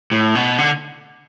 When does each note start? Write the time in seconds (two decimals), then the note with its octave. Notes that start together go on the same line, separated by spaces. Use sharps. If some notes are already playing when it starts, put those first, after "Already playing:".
0.12 A2
0.35 B2
0.58 D3